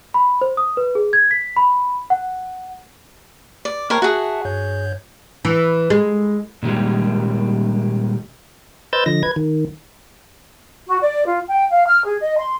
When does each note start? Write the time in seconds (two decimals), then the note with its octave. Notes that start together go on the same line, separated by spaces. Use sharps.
0.14 B5
0.41 C5
0.57 D#6
0.77 B4
0.95 G#4
1.13 G#6
1.31 B6
1.57 B5
2.10 F#5
3.65 D5
3.90 A#3 A#4 C5 C#5 G5 A5
4.02 F#4 G#4 E5 F#5 A5
4.45 G2 C#5 G6
5.45 E3
5.90 G#3
6.63 A#2 D#3 G3 G#3
8.93 B4 C5 D#5 E6 G6 A6
9.06 D3 F3 D#5 A#6
9.23 B4 G#6
9.36 D#3
10.86 F#4
11.02 D5
11.25 F4
11.48 G5
11.71 F5
11.87 F6
12.05 G#4
12.21 D#5
12.38 C6